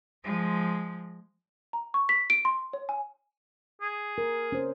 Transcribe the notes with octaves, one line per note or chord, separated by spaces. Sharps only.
F3 G#3
A#5
C#6
B6
D7
C6
C#5
G#5
G#4
A#4
C#4 C5